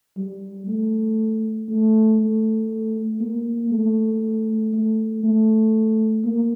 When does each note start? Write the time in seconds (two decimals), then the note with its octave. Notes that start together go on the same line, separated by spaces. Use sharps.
0.17 G3
0.67 A3
1.68 A3
2.19 A3
3.20 A#3
3.71 A3
4.73 A3
5.23 A3
6.24 A#3